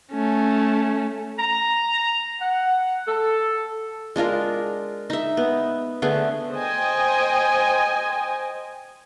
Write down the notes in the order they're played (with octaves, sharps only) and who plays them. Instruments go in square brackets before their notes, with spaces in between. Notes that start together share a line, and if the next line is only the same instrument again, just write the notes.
[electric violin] A3 C#4
[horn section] A#5
F#5
A4
[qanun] G#3 D4 F4 A#4
D#4 E5
B3
D3 A3 B3 G#4
[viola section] C5 D#5 G5 G#5